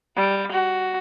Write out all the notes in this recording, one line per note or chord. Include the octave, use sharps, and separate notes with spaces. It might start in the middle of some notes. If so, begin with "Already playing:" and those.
G3
F#4